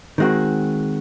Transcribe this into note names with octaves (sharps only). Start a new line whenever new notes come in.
D#3 G#3 C4 F#4